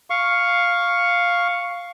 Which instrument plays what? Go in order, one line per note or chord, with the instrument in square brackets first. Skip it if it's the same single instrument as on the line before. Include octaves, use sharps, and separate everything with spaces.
[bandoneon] F5 C#6